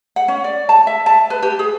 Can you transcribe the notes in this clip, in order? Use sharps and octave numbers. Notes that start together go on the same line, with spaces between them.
F#5
C#4
D5
A5
E5
A5
B4
G4
G#4